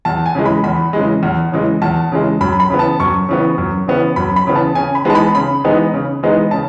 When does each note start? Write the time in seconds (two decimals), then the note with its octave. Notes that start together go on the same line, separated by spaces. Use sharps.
0.05 E2 A5
0.26 G#5
0.35 C#3 E3 G#3
0.45 B5
0.64 E2 B5
0.93 C#3 E3 G#3
1.23 E2
1.52 C#3 E3 G#3
1.82 E2 A5
2.12 C#3 E3 G#3
2.41 F#2 B5
2.60 B5
2.70 C#3 E3 B3
2.79 A5
3.00 F#2 C#6
3.29 C#3 E3 B3
3.58 F#2
3.88 C#3 E3 B3
4.16 F#2 B5
4.36 B5
4.47 C#3 E3 B3
4.55 A5
4.75 C#3 G#5
4.95 B5
5.05 E3 G#3 B3 D#4 A5
5.15 B5
5.35 C#3 B5
5.64 E3 G#3 B3 D#4
5.94 C#3
6.23 E3 G#3 B3 D#4
6.51 C#3 A5